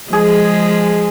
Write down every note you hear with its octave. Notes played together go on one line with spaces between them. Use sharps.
F3 G#3 G#4